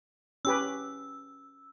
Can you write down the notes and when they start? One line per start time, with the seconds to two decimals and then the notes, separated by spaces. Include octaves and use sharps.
0.45 C#4 G4 B4 E6